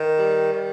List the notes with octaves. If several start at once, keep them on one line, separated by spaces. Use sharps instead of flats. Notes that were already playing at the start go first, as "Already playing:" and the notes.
Already playing: D#3
G3
D#3